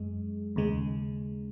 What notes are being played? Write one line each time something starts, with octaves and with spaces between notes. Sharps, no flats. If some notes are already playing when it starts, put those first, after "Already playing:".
Already playing: F#2 G#3
D#2 C#3 G#3